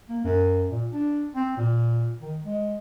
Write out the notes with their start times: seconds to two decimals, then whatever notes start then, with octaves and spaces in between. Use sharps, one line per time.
0.09 A#3
0.24 F#2
0.70 A#2
0.92 D4
1.35 C4
1.57 A#2
2.20 D#3
2.42 G#3